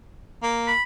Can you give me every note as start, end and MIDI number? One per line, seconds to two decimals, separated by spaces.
0.43 0.72 58
0.67 0.83 83